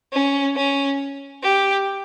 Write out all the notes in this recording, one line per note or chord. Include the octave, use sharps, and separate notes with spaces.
C#4
C#4
G4